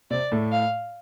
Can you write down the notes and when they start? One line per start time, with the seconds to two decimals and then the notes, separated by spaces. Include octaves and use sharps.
0.10 C3 C4 D5
0.32 A2 A3
0.52 F5